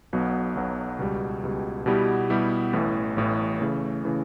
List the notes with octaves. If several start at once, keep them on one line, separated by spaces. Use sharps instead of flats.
B1 B2 F#3 B3
B1 B2 F#3 B3
C#2 B2 G3
C#2 B2 G3
B2 G3 B3 E4 G4
B2 G3 B3 E4 G4
A1 A2 E3
A1 A2 E3
C#3 E3 A3
C#3 E3 A3